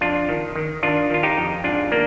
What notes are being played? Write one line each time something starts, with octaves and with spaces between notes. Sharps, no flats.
F2 D4 F4
D#3
D#3
D#3 D4 F4
D#3 F4
D#4 G4
F2
G#2 D4 F4
D#3 A#3 D4